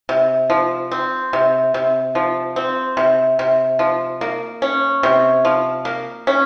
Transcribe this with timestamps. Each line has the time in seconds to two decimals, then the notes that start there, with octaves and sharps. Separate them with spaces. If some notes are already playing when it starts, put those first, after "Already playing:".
0.09 C3
0.50 F3
0.91 C4
1.33 C3
1.74 C3
2.15 F3
2.56 C4
2.97 C3
3.39 C3
3.79 F3
4.21 A#3
4.62 C#4
5.03 C3
5.45 F3
5.85 A#3
6.27 C#4